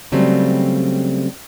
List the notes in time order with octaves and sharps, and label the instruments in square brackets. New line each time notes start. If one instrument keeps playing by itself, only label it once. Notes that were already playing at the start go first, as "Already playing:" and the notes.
[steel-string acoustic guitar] C#3 F#3 G3 A3 C4